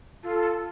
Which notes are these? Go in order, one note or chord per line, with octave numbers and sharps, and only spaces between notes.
F4 A4